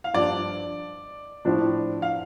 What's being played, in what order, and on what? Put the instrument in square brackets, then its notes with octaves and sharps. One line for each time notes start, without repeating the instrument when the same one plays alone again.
[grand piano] F5
[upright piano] G2 F3 D4 [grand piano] D5
[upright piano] A2 F3 D4
[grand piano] F5